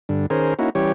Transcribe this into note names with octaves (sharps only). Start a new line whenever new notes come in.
G2 D3
D#3 C#4 G#4 A#4 C5
A#3 C#4 D#4 E4 F#4
E3 G3 C#4 G4 C#5